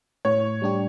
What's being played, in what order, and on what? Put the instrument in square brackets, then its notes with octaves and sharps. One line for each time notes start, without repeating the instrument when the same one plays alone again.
[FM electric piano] A2 [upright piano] C#5
[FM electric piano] G3 D4 G4